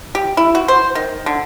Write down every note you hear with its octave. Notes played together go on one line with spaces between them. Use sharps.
G4
E4
F#4
C5
D#3
D3